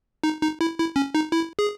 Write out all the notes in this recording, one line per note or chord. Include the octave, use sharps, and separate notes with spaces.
D#4
D#4
E4
E4
C#4
D#4
E4
G#4